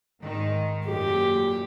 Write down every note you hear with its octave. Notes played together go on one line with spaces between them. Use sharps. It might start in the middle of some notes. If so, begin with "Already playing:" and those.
G#2 D#3
F#2 A#2 G4